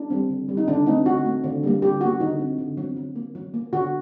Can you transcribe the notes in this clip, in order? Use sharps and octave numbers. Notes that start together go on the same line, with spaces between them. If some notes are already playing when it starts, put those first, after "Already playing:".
Already playing: D4
G3 C4
D3
G3 C4
D#4
D3 D4
A3 C4 D#4
D3 F#4
A3 C4
D3
G3 A#3
D3 G4
G3 A#3 F#4
D3 D#4
F#3 C4
D3
F#3
C4
F#3
A#3
F#3
A#3
D3 F#4